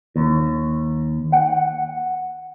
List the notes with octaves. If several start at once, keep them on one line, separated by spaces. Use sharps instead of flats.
D#2
F#5